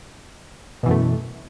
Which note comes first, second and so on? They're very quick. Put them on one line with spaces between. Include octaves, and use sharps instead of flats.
B2 E3 F#2 A3